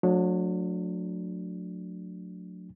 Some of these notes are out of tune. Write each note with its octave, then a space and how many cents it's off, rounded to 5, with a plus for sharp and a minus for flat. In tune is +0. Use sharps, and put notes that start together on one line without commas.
F#3 -35 A3 +0 D4 +0